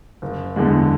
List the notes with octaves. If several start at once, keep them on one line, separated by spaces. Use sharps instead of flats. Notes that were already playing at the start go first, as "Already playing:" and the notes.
F#1
E2 D3 G#3